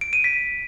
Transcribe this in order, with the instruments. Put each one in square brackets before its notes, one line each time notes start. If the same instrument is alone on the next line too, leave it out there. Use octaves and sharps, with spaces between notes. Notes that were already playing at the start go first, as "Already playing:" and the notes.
[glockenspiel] D7
D#7
B6